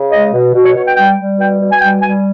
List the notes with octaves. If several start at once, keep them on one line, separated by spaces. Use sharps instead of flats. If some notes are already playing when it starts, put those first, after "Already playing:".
Already playing: C#3
G#3 D#5
B2
B2
C#5
B2 C#5
G5
G3 G5
G3
B2 G5
B2
G#5
G3 G5
G3 G#5